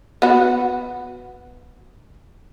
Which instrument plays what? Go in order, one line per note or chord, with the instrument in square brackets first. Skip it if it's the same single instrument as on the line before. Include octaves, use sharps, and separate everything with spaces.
[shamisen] B3 F#4